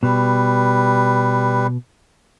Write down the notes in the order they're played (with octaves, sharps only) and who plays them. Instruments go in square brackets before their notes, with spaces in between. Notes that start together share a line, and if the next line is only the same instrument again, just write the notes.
[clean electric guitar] B2 [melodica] G3 B4